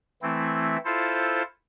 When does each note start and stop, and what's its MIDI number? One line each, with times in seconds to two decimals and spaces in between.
0.22 0.77 52
0.22 0.77 57
0.22 0.77 60
0.22 0.77 64
0.85 1.42 64
0.85 1.42 65
0.85 1.42 69
0.85 1.42 72